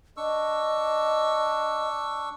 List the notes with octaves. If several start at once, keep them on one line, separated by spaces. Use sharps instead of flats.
D4 D#5 C#6 E6